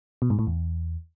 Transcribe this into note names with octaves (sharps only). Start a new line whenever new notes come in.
B2
G#2
A2
E2